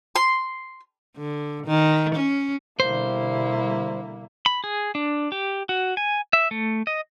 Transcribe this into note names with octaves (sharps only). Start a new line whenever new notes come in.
C6
D3
D#3
C#4
B2 D3 G3 A#3 E4 C5
B5
G#4
D4
G4
F#4
G#5
E5
A3
D#5